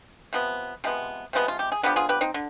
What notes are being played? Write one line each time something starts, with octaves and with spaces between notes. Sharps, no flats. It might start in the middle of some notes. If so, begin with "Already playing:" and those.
C3 F3 B3
C3 F3 G#3 B3
C3 F3 G#3 B3 D#4
F4
G4
G#4
D3 F3 B3 G4 B4
F4 G#4
G4 B4
C4 D#4
D3